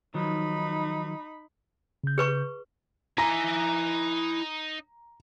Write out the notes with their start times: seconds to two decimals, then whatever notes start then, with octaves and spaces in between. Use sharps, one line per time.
0.14 D#3 F3 F#3 D#4 B5
2.04 C#3 G6
2.18 G#4 B4 C#6
3.18 D#4 E4 D#5 G#5 A#5